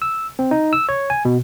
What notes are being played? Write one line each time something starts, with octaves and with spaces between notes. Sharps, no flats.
E6
C4
D#4
E6
C#5
G#5
B2